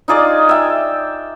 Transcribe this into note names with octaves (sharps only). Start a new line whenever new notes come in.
D#4 F4 G#4 D5
E5 G5